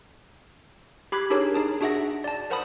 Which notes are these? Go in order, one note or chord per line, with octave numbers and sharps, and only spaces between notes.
G4 B5 D6 F#6 G#6 B6
D4 D#4 G4 G#4 A#4 C#5
D#4 G#4 A5
D4 F#4 G#4 E5 F#5 A#6
D5 A5
A#4 C5 F#5 A5 B5 D#6